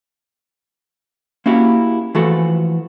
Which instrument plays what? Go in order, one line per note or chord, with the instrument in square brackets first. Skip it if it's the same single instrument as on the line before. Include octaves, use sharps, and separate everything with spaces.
[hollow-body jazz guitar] A#3 C#4 E4 F#4 G4
E3 F3 A3 F#4 A4